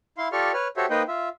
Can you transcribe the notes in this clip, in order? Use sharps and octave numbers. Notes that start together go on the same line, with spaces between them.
E4 F5 C6
F4 G4 A4 D5 C#6 F6
B4 C#5 F6
F#4 G4 A4 C5 C#5 E5
A#3 D#4 B4 C5 D#5 G5
F4 E5